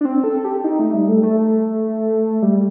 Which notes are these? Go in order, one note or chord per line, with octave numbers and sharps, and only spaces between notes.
D4
C4
A4
G4
D#4
A3
G3
A3
A3
G3